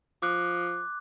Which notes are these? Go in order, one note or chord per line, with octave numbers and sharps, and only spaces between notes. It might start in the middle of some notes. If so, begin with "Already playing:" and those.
F3 D6 F#6